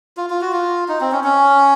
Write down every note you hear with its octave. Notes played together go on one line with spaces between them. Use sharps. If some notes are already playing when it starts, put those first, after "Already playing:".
F4
F4
F#4
F4
D#4
C4
C#4
C#4